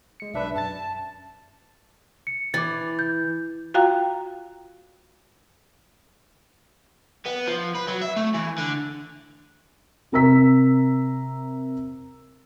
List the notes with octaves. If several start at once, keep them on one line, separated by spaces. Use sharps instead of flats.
G#3 C#7
B1 D4 B4 E5
F#2 A5 A6
C#7
E3 D6 A6
G6
F4 F#4 F5 G5 A#5
B3
F3
B4
F#3
E5
A3
E3
D3
C3 A#4 A#5 E6 B6